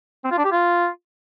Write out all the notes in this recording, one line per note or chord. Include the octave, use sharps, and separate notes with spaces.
C4
F4
D4
G4
F4